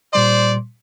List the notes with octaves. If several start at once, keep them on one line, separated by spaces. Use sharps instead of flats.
A#2 G3 C5 D5 C6